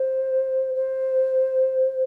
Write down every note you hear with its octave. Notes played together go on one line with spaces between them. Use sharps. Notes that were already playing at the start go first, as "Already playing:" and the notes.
Already playing: C5
C5